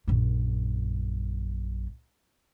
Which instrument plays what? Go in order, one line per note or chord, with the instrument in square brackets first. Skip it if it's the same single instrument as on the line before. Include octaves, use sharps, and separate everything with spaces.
[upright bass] A#1 F#2